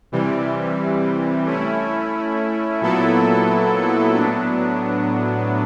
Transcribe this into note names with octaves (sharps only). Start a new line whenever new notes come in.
C3 E3 G3
A3 C#4 E4
A#2 F#3 B3 E4 A4
A2 F#3 B3 D4